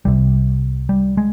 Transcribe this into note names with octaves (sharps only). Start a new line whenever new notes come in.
C2 C3 G3
G3
G#3